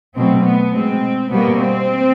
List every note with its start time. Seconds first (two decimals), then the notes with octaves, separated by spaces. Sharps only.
0.15 B2 F#3 A3 C4
0.45 B3
0.74 B2 G#3 C4
1.31 B2 G3 A#3 B3
1.59 C4